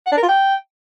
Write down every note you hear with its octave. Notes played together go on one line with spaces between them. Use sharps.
F#5
D4
A#4
F4
G5